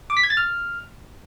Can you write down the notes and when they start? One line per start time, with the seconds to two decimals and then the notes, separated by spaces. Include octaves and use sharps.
0.10 D6
0.17 B6
0.23 G#6
0.30 A6
0.37 F6